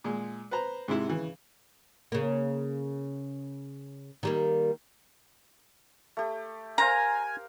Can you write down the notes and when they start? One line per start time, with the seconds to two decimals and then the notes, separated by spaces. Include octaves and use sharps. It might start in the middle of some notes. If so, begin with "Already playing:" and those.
0.04 A#2 G#3
0.51 B4 C5 A#5
0.88 G#2 C3 E4
1.08 C#3 E3
2.12 C#3 A#3
4.23 D#3 G3 A#3
6.17 A3 G4
6.78 A#4 C5 F5 G#5 A#5